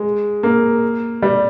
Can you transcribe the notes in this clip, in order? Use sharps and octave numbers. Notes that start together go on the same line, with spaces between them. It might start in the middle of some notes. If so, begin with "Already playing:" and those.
Already playing: G#3
A#3
G3